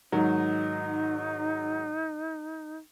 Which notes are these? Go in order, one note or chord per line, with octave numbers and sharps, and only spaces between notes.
G#2 D#3 F#3 D#4